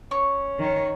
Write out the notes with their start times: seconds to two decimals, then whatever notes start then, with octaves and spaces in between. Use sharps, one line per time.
0.11 C#4 C#6
0.59 D#3 C#5